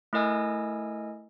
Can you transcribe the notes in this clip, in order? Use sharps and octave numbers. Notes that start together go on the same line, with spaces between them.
A3 E4 A#4 D#5 G#5 E6